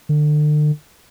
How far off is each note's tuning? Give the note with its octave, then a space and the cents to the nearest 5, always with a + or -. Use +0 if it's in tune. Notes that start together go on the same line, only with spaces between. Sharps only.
D3 +35